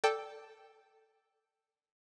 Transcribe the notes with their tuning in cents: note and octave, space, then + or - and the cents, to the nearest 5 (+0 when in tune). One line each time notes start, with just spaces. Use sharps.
A4 +0 D5 +0 G5 +0